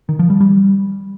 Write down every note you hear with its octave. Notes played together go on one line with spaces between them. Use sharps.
D#3
F3
G3
G3